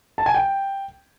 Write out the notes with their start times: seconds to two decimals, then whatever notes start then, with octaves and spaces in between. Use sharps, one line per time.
0.18 A5
0.26 G#5
0.34 G5